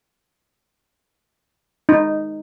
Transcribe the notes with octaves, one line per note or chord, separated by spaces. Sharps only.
D#4